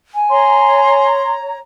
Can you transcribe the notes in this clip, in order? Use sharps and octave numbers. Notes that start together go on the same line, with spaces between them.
G#5
C#5 A#5 C6